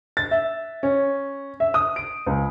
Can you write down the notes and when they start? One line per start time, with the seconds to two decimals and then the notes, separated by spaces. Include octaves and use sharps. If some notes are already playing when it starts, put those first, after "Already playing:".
0.17 A6
0.31 E5
0.83 C#4
1.60 E5
1.74 D#6
1.96 D7
2.27 C#2